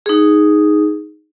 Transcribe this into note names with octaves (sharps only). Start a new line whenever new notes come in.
D#4 G#4